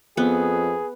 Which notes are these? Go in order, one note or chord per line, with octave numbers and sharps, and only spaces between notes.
F2 B3 G#4